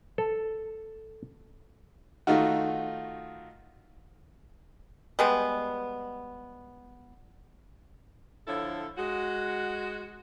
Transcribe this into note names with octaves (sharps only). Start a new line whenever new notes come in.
A4
D#3 A3 D#4 F4 F#4
G3 G#3 B3
D3 F3 E4 A4 C#5
G#3 F#4